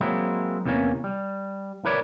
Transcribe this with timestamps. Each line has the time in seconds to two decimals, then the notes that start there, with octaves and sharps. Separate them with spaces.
0.01 F#3 G#3 A#3 C4 E4
0.65 E2 C3 E3 A#3 C#4
1.04 G3
1.85 E4 A#4 B4 C#5 D5